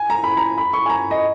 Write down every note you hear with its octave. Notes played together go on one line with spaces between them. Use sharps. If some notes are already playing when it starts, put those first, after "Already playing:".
Already playing: G#5
A#5
B5
A#5
B5
C#6
G#5
A#5
D#5